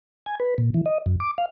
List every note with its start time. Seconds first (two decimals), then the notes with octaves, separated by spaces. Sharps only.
0.26 G#5
0.40 B4
0.58 A#2
0.74 E3
0.86 D#5
1.06 F#2
1.20 D6
1.38 F5